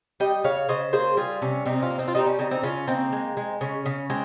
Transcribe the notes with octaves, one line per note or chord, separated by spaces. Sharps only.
G3 D#5 G5
C#3 C#5 F5
C#3 C5 D#5
A#3 G#4 C5
G3 F4 G#4
C3 C#4
C3 C4 D#4
C#4 F4
A#3
C4 D#4
F4
G3 C4 D#4
C#4
C#3 C4 D#4
C4 D#4
C#3 C#4 F4
A#3 C4 D#4
G#3
G#3
C#3 C#4
C#3
G#3 C4